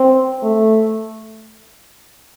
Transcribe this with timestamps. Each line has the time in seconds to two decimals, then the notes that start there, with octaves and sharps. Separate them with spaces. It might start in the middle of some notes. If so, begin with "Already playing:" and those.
Already playing: C4
0.43 A3